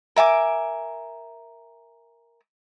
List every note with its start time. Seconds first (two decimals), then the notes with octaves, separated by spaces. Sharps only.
0.16 A#4 E5 G#5 D6